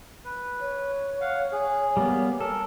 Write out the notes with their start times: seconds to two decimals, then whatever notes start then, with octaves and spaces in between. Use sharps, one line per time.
0.24 B4
0.60 C#5
1.21 F5 F#5
1.52 G#4
1.97 G3 A#3 B3
2.40 A4 A#4